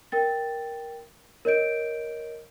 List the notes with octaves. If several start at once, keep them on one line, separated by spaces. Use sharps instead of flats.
A#4 G5 A6
A#4 C#5 D#5 G6 D7